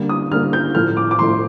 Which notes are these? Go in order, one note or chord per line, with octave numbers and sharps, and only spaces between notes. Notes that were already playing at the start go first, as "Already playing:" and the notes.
Already playing: D3 G3 A#3
D#6
D3 G3 A#3 F6
G6
A2 F3 A3 F6
D6
D6
A2 F3 A3 C6